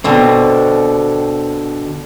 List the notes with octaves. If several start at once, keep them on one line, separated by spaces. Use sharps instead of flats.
B2 D3 C4